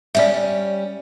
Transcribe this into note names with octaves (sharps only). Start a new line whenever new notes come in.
G3 C#4 D5 E5